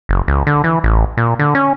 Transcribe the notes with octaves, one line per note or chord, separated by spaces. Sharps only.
F#1
C#2
D3
E3
A1
A#2
D3
C#4